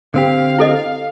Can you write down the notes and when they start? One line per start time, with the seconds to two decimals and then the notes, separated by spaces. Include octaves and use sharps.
0.14 D3 C4 G4 F5
0.58 E4 A4 D#5